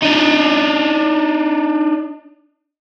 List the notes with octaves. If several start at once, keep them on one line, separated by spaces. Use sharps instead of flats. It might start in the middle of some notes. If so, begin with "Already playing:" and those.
D4 D#4